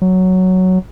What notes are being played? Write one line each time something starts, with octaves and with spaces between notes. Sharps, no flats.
F#3